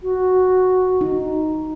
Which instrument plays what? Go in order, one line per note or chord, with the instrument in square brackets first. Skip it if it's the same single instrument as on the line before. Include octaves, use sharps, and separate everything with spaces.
[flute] F#4
[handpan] D#4